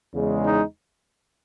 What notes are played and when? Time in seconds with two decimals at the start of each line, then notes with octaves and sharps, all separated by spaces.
0.14 E2 C#3 G#3
0.44 D#4